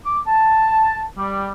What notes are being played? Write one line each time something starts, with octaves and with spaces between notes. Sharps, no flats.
D6
A5
G3